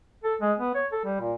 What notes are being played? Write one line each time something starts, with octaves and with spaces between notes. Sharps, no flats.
A4
G#3
B3
C#5
A4
G3
A#2